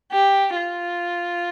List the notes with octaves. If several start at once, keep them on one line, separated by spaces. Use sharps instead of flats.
G4
F4